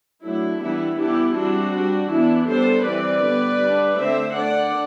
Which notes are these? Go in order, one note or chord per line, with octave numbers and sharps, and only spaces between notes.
F#3 A3 D4 E4
E3 G3 B3 D4 E4
E3 G3 B3 D4 E4 G4
G3 C4 D4 F#4
G3 D4
E3 B3 D4 E4
G3 B3 D4 A4 C5
E3 G3 C4 B4 D5
D3 G3 B3
G3 D4
D3 A3 C4 C5 E5
D3 A3 D4 D5 F#5